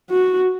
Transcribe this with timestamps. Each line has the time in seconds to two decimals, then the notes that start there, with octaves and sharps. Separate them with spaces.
0.10 F#4